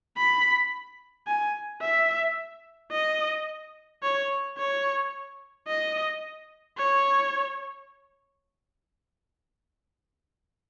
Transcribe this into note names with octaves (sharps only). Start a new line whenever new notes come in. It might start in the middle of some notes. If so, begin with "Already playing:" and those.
B5
G#5
E5
D#5
C#5
C#5
D#5
C#5